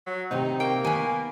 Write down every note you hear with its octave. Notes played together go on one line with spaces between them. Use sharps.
F#3
C3 D#3 C4 D#4
A#3 G5
D#3 B3 G#5